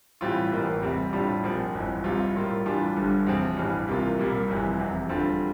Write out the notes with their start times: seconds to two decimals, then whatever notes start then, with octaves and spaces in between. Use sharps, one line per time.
0.21 A2 E3 G3 C4 F4
0.52 A1 A2 E3 A#3
0.82 E2 C3 G3 C4
1.13 A2 G3 D4 F4
1.43 A#1 A#2 F3 C4
1.74 G1 F2 E3
2.04 C2 C3 G3 C4 F4
2.35 A2 G3 A#3 F4
2.65 A2 E3 G3 D4 F4
2.96 G1 G2 D3
3.27 E2 C3 F3 C4
3.57 A1 G2 E3 G3
3.88 C2 C3 E3 A#3 F4
4.18 C2 A#2 G3 A#3
4.48 G1 F2 C3 E3
4.79 F1 E2 C3
5.09 E2 D3 G3 C4 F4